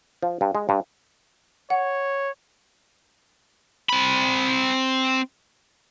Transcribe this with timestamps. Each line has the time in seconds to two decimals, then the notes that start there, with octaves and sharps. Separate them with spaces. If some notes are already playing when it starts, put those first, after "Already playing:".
0.23 F3
0.41 G2
0.55 G#3
0.69 G2
1.70 C#5 F#5
3.89 C4 B5